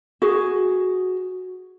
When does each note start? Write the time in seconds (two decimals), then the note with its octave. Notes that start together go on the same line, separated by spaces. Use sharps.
0.22 F#4 G#4